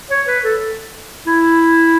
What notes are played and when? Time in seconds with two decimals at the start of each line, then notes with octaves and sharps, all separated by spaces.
0.10 C#5
0.27 B4
0.44 A4
1.26 E4